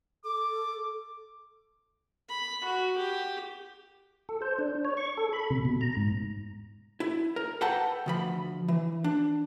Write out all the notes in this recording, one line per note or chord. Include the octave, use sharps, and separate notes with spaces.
A4 D6
B5
F#4
G4
A4
C5
D4
C#5
C#6
A4
B5
C3
B2
A#5
G#2
E4
A#4
A4 B4 F#5 G5 A5 A#5
D2 F3 B5
E3
D4